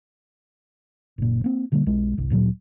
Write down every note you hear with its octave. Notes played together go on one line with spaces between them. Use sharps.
F#1 A#2
A#3 C4
B2 D3 G3 A#3
B1 G#3
G1 C2
D1 A#2 F3 F#3